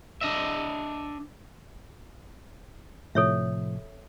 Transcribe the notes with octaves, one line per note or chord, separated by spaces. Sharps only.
D4 D#5 E5
A2 C3 F3 A4 C#5 E5